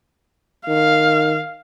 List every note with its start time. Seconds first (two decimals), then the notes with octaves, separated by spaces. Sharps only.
0.68 D#3 F5